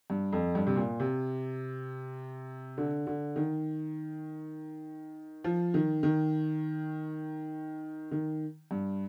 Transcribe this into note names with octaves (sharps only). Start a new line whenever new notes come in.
G2
F2
G2
C3
A#2
C3
D3
D3
D#3
F3
D#3
D#3
D#3
G2